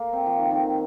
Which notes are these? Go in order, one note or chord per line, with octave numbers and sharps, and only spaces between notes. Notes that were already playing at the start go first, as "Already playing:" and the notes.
Already playing: A#3
C4
F3
D#3
D#3